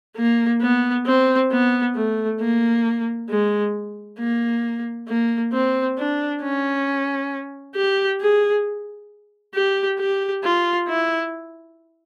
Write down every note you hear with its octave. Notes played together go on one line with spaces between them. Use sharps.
A#3
B3
C4
B3
A3
A#3
G#3
A#3
A#3
C4
D4
C#4
G4
G#4
G4
G4
F4
E4